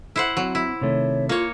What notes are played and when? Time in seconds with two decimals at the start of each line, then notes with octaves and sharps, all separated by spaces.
0.16 E4 C5 F#5
0.37 F#3 C4
0.55 E4
0.81 C3 D#3 A3 C#5
1.29 A#3 F4 C#5